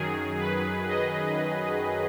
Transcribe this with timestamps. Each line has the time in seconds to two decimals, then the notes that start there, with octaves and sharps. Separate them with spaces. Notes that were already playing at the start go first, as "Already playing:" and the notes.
Already playing: F#2 D#3 F#3 G#4
0.39 B4
0.88 D#5